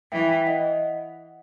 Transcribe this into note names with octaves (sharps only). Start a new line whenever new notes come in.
E3 E5 G5
D#5 F#5